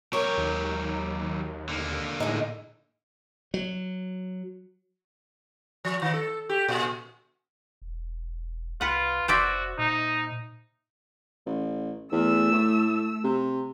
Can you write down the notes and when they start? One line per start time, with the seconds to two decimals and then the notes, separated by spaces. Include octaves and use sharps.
0.13 F#3 G4 A#4 C#5
0.38 D#2
1.69 D3 A#3
2.20 A2 G#3 D#4
3.54 F#3
5.85 F3
6.02 D#3
6.14 A4
6.49 G4
6.68 A#2
7.82 E1
8.81 C2 F4 B4 F#5
9.28 F1 F#4 C5 D5 E5
9.78 A#2 D#4
11.46 A1
12.12 E2 A3 E6
12.53 A2
13.24 C3